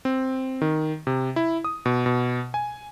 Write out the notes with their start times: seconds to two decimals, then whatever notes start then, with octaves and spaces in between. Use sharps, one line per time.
0.05 C4
0.61 D#3
1.07 C3
1.36 E4
1.64 D#6
1.86 B2
2.06 B2
2.54 G#5